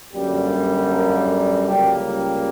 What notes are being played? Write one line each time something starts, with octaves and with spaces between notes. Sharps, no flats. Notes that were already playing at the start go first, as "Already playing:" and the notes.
F#2 D3 G3 A#3 G4
A#4
C#2 C#3 G3 A#3 G4